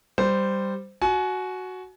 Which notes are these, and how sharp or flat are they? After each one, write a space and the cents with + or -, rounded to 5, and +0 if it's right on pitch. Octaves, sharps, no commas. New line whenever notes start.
G3 +0 C5 -10
F#4 +0 G#5 +35